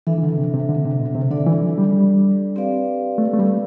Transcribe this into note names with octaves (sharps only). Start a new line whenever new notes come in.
E3 D4 A4 E5
E3
D3
C3
C3
D3
C3
B2
C3
D3 D4 A4 D5
E3
F3
G3
G3
C4 G4 B4 D5 F5
A3
A3
G3